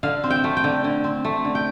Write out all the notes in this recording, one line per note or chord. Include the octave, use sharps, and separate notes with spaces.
D3 F5
C4
G5
A3
G5
D3
D3
C4
A3
D3
G5